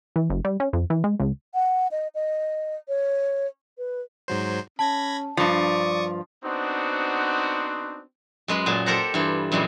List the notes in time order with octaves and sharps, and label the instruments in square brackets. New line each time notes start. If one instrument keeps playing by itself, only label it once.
[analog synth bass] E3
F#1
G3
C#4
F2
E3
G#3
C#2
[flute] F#5
D#5
D#5
C#5
B4
[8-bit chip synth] G#2 F#3 C5
[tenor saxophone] C#4 [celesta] A5 [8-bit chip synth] B5 G#6 A#6
[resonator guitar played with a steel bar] G2 F3 [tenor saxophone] D5 [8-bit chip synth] C#6 D#6
[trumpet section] B3 C4 D4 D#4 F#4 C5
[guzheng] F#2 G#3 B4 C6
A#2 F#3 G#4 A5
G4 A4 A#4 C5 F#5 A#5
G2 E3 F4
F#2 A#2 E3 G3 G#3